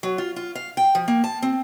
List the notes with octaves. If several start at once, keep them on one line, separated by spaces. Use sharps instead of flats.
F#3
F4
F4
F5
G5
F3
A#3
A5
C4